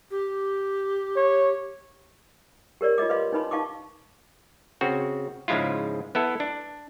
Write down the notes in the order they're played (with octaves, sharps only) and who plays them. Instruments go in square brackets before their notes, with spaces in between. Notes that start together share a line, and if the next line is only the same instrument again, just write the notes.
[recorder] G4
[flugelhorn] C#5
[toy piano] G4 A#4 C#5 D5
F4 C#5 D#5 D6
B4 D#5 F5 C6
D4 D#4 B4 B5 C6
D#4 F5 A5 C#6 D6
[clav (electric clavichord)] C#3 C4 F#4
G#2 C#3 F3 G#3 E4 F4
B3 E4 A4
D4